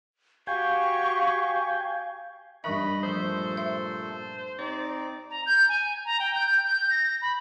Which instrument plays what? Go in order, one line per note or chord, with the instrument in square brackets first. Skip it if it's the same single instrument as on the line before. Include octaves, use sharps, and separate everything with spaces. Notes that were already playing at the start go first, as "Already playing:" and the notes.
[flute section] F#4 G4 C#6 [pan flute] F5 [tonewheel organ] G5 G#5
[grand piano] G2 C#6 [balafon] E3 A#4 E5 [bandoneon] D#5 [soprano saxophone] B5
[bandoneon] A#2 A3 A4 [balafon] F3 [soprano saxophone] C5
[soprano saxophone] C5 [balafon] E5
[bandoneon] C4 D#4 [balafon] C5 [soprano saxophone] D5
[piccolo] A#5
G6
G#5
A#5
G5
G6
G6
G6
A#6
B5